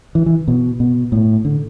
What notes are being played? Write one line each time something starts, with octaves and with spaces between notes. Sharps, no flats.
E3
E3
B2
B2
A2
D3